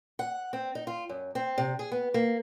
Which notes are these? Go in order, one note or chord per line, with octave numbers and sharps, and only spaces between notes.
F#5
C4
D#4
F4
F#2
C4
C3
G#4
B3
A#3